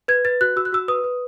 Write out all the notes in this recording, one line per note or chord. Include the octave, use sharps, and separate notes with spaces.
B4 G#6
B4 A6
F#4 F#6
F#4 E6
F#6
F#4 E6
B4 D#6
B4